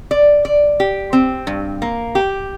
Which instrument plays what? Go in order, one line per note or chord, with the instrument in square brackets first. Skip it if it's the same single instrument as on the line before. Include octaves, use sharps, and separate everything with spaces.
[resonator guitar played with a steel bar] D5
D5
G4
C4
G2
A#3
G4